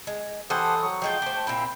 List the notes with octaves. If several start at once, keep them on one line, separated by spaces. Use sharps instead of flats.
G#3
E3 G4 A4 C5 F#5 D#6
F#3 C#6
F3 G#3 F4 G5
A3 C5 D6
A#2 C4 E4 G5